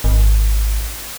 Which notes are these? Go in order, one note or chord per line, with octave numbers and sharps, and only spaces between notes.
G#1